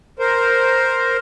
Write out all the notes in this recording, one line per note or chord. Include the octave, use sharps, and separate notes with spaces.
A#4 C5